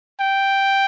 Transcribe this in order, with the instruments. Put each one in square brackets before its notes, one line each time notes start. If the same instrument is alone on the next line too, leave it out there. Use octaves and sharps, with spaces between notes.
[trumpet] G5